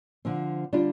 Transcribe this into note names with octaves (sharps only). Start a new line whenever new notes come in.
D3 F3 C4
D3 G3 D4 F4